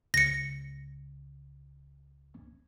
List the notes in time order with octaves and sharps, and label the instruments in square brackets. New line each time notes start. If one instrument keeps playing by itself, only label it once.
[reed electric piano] C#2 [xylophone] A#6 C#7